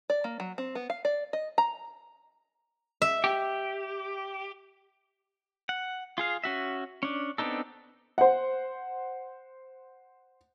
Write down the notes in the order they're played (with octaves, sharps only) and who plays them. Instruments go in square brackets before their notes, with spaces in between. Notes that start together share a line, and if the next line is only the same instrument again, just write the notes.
[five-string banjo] D5
A#3
F#3
C4
B3
F5
D5
D#5
A#5
[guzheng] E5
[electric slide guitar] G4
[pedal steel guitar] F#5
F4 G#4 F5
C#4 F#4 E5
C#4 D4
B3 C4 D4 D#4 A4
[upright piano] C5 F#5